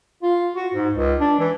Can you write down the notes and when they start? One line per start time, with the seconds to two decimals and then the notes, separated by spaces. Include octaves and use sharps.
0.23 F4
0.56 F#4
0.74 G#2
0.93 C#2
1.20 D4
1.39 E3